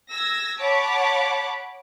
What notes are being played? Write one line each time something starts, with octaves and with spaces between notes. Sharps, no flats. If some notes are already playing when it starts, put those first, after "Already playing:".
E6 G#6 A#6
C#5 F#5 A5 B5 D6